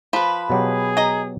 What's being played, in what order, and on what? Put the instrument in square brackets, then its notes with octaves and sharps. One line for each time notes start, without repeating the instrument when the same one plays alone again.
[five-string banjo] F3 [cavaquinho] B4 B5
[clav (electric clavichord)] B2 F#3 G4 [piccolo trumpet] G#4
[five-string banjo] D#5 A#5